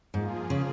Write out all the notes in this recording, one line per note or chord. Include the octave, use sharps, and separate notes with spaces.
G#2 F3 A#3 F4 G#4
C#3